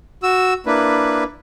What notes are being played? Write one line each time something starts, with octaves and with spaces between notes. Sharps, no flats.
F#4 E6
A#3 D4 E4 B4